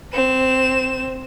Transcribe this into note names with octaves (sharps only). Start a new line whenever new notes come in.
C4 E7